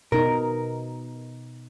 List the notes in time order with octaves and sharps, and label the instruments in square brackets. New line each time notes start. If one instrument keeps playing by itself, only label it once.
[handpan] B2 D#4 [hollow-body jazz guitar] A#4